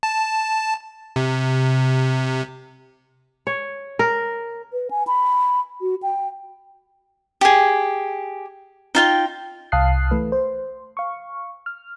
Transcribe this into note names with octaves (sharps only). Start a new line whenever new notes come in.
A5
C3
C#5
A#4
B4
G#5
B5
F#4
G5
G4 G#4
D#4 F4 G5
C2 F5 A5 D#6 F#6 C7
E3 A3 B4
C5
F5 C#6
F6